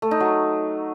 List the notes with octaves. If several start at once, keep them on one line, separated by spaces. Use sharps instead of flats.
A3
D#4
F#3